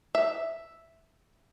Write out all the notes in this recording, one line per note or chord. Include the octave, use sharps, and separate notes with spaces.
E5